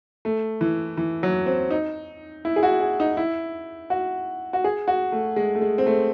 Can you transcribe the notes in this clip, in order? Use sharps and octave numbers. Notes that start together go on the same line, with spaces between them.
A3
E3
E3
F#3
C4
D#4
E4
G#4
F#4
G#4
D#4
E4
F#4
F#4
G#4
F#4
A3
G#3
A3
G#3
C4
A3